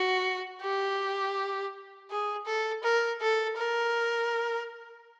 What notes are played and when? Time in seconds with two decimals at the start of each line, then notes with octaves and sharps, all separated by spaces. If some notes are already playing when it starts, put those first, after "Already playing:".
Already playing: F#4
0.61 G4
2.10 G#4
2.46 A4
2.83 A#4
3.21 A4
3.57 A#4